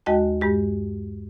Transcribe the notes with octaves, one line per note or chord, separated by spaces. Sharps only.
D#2 G#3 F#4 D#5 G5 A5
G2 G#3 G4